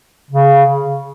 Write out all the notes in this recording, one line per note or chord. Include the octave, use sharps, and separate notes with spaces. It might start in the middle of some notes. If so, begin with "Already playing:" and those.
C#3